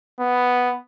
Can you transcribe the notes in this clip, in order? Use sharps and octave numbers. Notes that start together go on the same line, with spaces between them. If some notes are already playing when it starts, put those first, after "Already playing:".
B3